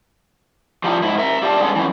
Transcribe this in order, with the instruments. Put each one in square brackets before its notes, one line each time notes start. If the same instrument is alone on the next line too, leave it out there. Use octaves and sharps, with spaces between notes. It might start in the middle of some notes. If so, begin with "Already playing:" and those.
[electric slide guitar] F3 G3 D#4 E4
G#2 E4
A#4 E5
A3 G4 D5 F5 A5
G2 G#3 B3 C#4 G#4 A4
F#2 E3